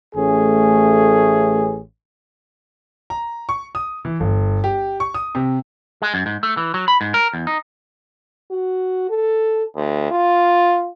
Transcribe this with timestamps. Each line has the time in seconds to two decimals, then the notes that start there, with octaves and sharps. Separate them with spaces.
0.15 A1 A3 C#4 G#4
3.10 A#5
3.49 C#6
3.75 D#6
4.05 E3
4.20 G1
4.64 G4
5.00 C#6
5.14 D#6
5.35 C3
6.02 G#3
6.14 F#2
6.26 G#2
6.43 A3
6.57 E3
6.74 F#3
6.88 B5
7.01 G#2
7.14 A#4
7.34 E2
7.47 D#4
8.51 F#4
9.10 A4
9.76 D2
10.11 F4